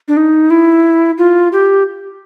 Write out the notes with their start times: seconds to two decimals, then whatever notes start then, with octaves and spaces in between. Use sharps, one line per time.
0.08 D4
0.17 D#4
0.50 E4
1.18 F4
1.52 G4